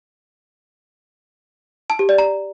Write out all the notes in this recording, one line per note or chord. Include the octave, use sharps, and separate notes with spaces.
A5
G4
D5
A#5